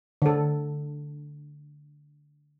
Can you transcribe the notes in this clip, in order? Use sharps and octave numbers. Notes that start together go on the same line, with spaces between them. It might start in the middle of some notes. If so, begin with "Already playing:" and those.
D3 A4